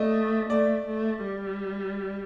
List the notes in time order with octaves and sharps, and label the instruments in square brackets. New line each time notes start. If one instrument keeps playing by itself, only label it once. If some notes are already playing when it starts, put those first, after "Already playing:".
Already playing: [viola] A3 [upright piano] D5 D#5
[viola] A3 [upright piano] D5
[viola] A3
G3